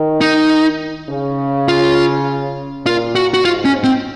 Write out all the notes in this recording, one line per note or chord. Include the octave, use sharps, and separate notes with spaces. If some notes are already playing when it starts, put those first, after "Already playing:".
Already playing: D#3
D#4
C#3
F4
A#2 F4
F#4
F#4
G#2 F4
C#4
C4